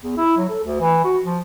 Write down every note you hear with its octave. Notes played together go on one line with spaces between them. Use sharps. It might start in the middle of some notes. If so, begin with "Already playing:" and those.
E2
E4
F#3
A4
D2
E3
F#4
F3